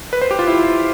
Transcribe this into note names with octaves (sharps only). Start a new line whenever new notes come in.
B4
C5
G4
F4
E4